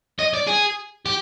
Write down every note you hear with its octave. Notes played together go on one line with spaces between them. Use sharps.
D#5
D5
G#4
G4